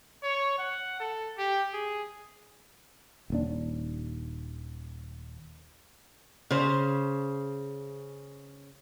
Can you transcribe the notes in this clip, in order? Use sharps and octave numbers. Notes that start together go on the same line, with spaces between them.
C#5
F#5
A4
G4
G#4
D#1 D#2 D4
C#3 C5